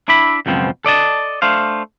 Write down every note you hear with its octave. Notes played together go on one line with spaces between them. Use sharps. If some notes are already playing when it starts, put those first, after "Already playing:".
D4 E4 D5 E5 B5
C#2 F#2 B2 F3 C4
A4 D5 D#5 A5
A3 D4 C5 F5